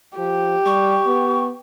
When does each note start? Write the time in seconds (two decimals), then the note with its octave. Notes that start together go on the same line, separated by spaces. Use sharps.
0.18 F3 G4
0.66 G3 C#6
1.07 B3